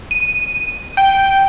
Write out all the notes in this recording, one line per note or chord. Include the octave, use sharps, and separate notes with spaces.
D#7
G5